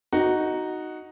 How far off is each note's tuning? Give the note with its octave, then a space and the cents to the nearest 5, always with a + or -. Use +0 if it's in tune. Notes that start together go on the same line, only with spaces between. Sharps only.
D#4 +0 F#4 +0